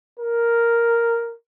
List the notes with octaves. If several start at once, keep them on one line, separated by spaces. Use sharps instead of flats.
A#4